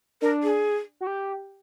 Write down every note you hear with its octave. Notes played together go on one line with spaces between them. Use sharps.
D4 A#4
G#4
F#4
G4